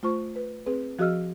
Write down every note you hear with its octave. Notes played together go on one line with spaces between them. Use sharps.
A3 F4 C5 C#6
B4
C4 G#4 B4
F3 F#4 G#4 D#5 E6 F6